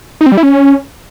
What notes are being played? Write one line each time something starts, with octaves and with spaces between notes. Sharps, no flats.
D#4
C4
G3
E4
C#4